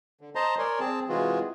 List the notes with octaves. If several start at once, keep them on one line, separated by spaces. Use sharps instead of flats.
D3
C5 D#5 A5 A#5 C6
A#4 C#5 D5 G#5 C6
C4 G#4 A5
C3 E3 G#3 F4 F#4 G#4